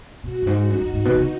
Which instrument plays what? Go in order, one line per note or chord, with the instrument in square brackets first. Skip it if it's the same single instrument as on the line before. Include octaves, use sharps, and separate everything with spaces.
[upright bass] B2 [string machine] F#4
[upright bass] F#2
G#2
[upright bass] F#2 [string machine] D#4
[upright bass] F#2
G#2
B2
D#3
C#3